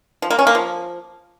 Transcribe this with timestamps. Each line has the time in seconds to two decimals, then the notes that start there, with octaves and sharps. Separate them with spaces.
0.22 F3
0.30 A#3
0.39 C#4
0.47 A#3
0.55 F3